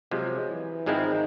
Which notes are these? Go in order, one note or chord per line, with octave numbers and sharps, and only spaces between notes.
C3 F3 F#3 G#3
E3
G#2 D#3 F3 G#3 C4 E4